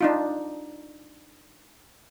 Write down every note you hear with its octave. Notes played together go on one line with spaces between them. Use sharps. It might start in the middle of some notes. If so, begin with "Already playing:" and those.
D4 D#4 F4